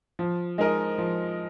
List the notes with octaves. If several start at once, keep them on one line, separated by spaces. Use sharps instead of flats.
F3
G#3 D#4 A#4 D#5
F3